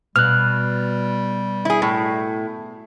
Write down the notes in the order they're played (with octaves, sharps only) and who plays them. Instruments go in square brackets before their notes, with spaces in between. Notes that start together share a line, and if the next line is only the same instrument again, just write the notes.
[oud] B2 [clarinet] G3 [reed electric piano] F6 F#6
[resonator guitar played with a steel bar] E4 G#4
A2